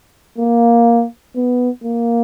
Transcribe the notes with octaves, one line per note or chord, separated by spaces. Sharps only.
A#3
B3
A#3